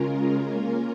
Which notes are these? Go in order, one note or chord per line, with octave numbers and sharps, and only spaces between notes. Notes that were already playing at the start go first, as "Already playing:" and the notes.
Already playing: C#3 G#3 C#4 F4 A#4
A#3 C#4 F4 A#4